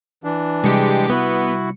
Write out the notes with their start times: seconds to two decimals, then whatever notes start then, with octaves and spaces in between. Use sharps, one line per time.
0.24 E3 D4
0.64 C3 G3 G#3 G4 C#7
1.10 B3 E4 F#4